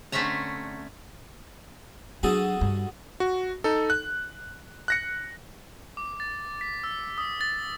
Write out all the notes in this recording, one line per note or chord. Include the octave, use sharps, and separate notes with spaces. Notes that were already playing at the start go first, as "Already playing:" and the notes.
D3 A3 C4 C#4 E5 A#5
F#3 D4 F#4 G#4 A4
G2
F#4
D#4 A4
F#6
F#6 A#6 C#7
D6
A6
B6
E6
D#6
A6